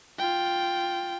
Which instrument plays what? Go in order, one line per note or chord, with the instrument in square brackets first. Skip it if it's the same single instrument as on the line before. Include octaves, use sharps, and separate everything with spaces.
[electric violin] F4 G5